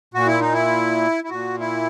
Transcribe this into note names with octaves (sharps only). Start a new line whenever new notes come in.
A#2 F#4
E4
D#4
E4
E4
A#2 F#4
E4